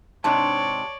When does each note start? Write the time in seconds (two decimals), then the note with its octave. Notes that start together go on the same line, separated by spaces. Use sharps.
0.24 G#2 C3 D4 C#5 D5 A5